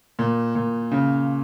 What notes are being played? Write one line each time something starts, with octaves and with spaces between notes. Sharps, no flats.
A#2
A#2
C#3